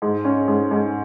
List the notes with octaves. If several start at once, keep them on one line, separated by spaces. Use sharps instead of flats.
G#2
C#4
G#2
G#2